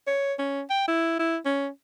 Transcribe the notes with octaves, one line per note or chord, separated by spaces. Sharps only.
C#5
C#4
G5
E4
E4
C#4